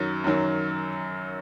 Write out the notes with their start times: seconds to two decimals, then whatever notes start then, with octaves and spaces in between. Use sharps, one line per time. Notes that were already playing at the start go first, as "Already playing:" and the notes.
Already playing: F#2 D#3 F#3
0.24 F#2 D#3 F#3